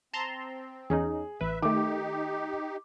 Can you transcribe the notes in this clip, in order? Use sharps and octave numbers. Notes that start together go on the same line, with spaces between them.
C4 A5 A#5 C6
E2 C#4 D#4 G#4
A1 B4 E5
D#3 A3 D#4 G4 D6